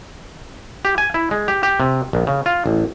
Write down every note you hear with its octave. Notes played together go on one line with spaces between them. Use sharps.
G4
G#5
E4
G#3
G4
G4
C3
A#1
C#3
F4
A1